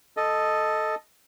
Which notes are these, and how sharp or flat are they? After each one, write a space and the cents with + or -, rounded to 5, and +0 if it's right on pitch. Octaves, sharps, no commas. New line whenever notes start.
A4 +0 D#5 +0